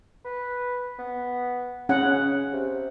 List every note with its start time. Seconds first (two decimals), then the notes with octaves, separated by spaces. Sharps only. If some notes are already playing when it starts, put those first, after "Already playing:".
0.25 B4
0.99 B3
1.89 C#3 C#4 F#5
2.53 C3